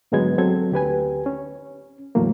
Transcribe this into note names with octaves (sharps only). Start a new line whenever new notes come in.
G#2 D3 F#3 G#3 B3 G#6
F#3 C4 A4 G#6
D2 G4 B4 G#5
C#4
E2 A2 D3 F#3 A3 A#3